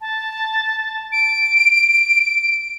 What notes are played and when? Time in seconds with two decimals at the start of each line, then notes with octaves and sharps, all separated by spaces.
0.01 A5
1.12 D7